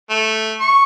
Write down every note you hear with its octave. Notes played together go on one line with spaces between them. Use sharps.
A3
C#6